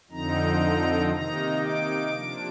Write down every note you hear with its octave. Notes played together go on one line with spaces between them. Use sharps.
F2 D3 F3 C4 D#4 A#5
C3 D#3 A#3 D#4 A#5
D6
C3 F3 A#3 D4